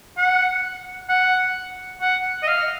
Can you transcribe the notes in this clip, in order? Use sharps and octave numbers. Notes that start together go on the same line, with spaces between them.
F#5
F#5
F#5
D#5
F5